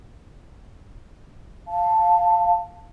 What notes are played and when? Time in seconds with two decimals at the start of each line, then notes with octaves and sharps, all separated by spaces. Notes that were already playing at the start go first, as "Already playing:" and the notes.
1.68 F5 A5